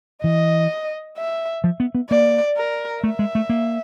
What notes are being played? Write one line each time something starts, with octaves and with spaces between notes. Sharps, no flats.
E3 D#5
E5
F3
B3
B3
A#3 D5
A#4
A3 E5
G#3
A3
A#3